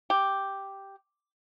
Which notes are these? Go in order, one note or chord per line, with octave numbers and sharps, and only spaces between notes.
G4